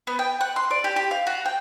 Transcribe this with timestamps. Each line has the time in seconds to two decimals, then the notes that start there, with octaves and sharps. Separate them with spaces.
0.07 B3
0.19 G5
0.41 F#5
0.56 C6
0.71 D5
0.84 G4
0.96 G4
1.11 F5
1.27 F#4
1.45 G5